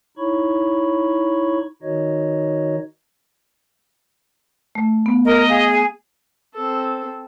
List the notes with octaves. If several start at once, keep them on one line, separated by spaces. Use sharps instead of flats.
D#4 E4 C#5 B5 C#6
D#3 D#4 F#4 C#5 D#5
A3
B3
A#4 D#5
G#4 F5
C4 A4